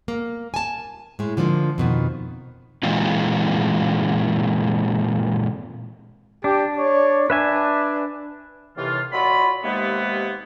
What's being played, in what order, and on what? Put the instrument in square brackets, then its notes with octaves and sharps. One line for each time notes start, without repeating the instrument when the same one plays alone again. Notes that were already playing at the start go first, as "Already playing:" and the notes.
[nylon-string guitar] A#3
G#5 A5
A2 G#3
D3 F3 G#3 A#3
F2 B2 D#3
[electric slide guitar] A#2 E3 F#3 G#3 C4 F4
[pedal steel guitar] D4 [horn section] G4
[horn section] C#5 D5
[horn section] D4 [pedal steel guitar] B4 E5 G#5
[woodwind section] D#2 A2 C3 E3 F4
A#2 F#3 F4 D#5 B5
D#2 C3 G#3 A#3 B3